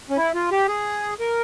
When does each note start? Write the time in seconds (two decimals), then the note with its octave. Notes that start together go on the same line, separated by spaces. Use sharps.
0.10 C#4
0.17 E4
0.34 F4
0.51 G4
0.68 G#4
1.20 A#4